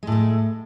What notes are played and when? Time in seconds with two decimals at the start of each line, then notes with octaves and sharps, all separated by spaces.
0.03 G#3
0.07 A2
0.12 A3